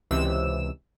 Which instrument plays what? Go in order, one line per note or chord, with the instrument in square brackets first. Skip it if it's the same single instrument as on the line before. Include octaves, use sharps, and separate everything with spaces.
[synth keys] C#2 C3 E3 E6 E7